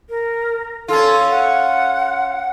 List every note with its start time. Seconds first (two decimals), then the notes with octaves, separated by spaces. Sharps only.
0.09 A#4
0.88 C#4 F4 A4
1.31 F#5